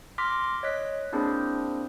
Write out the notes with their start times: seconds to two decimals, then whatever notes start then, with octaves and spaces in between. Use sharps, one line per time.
0.18 C6 D6 F6 A#6 B6
0.63 C#5 D#5 F#6 B6
1.13 A#3 C4 D4 E4 G#4 C5